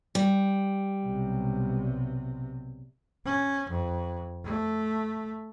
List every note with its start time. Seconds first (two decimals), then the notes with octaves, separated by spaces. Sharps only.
0.15 G3
1.05 B1 C3
3.26 C#4
3.70 F2
4.45 A3